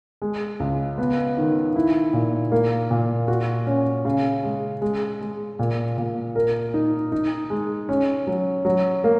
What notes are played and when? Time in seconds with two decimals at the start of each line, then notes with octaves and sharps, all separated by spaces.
0.22 G#3
0.60 C#2
0.98 B3
1.37 D#3
1.76 E4
2.13 A#2
2.52 A#3
2.91 A#2
3.28 F#4
3.67 C#4
4.05 C#3
4.44 G#3
4.82 G#3
5.21 G#3
5.59 A#2
5.98 A#2
6.36 A#4
6.74 D#4
7.12 D#4
7.50 G#3
7.89 C#4
8.27 F#3
8.65 F#3
9.04 A#3